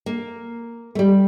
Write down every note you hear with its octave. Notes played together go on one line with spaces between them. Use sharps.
A#3
A3
G3